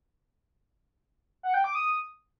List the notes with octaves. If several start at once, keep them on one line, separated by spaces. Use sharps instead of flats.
F#5
G5
D6
D#6